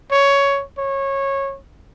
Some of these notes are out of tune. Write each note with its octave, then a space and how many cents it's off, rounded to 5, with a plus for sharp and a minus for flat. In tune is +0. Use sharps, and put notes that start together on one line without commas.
C#5 +10
C#5 -20